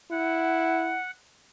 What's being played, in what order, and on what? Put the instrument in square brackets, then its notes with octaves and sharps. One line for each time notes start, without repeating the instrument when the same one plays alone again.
[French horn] E4 [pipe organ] F#5